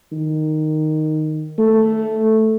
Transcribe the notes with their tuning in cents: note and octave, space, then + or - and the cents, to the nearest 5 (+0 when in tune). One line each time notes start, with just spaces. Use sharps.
D#3 -5
A3 +0